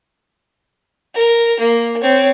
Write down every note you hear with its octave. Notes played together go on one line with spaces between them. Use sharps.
A#4
A#3
C4 C#5